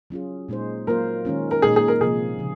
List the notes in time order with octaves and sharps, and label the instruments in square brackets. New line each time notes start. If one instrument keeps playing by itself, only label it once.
[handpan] F#3 C#4 F4 G#4
A#2 G#3 D#4 G#4 C5
[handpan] F#3 A#3 F4 C5 [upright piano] A#4
[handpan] D#3 G#3 C#4 F4
[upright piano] A#4
[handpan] A#2 G#3 D#4 [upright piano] G#4
[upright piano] G#4
A#4
[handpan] C3 F3 A#3 [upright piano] G#4
[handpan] C#3 F3